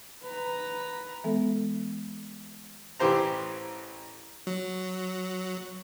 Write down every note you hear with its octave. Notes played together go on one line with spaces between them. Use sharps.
B4 A#5
E3 G#3 B3 A4
A1 E3 G4 C5 A#5
F#3